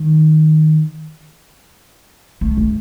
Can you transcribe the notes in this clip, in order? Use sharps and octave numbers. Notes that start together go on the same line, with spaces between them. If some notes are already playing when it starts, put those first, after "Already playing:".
Already playing: D#3
A3
A3